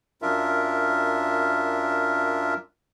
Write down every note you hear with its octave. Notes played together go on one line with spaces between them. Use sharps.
F#2 D4 F4 A#4 E5